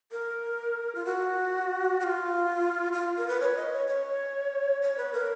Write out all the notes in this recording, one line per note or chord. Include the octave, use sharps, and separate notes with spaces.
A#4
F4
F#4
F#4
F4
F4
A#4
B4
C#5
D#5
C#5
C#5
C#5
B4
A#4